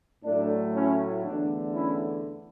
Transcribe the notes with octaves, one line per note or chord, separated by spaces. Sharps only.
A2 F#3 A3 D4
C#4 E4
E2 D3 A3 D4
C#4 E4